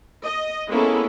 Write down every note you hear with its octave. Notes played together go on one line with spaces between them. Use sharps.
D#5
G#3 A#3 B3 C#4 E4 A4